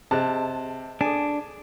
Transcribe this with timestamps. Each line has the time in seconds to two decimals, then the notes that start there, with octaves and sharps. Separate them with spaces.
0.11 C3 G#4 C5 D#5 A5
1.01 D4 G#4 A4 G#5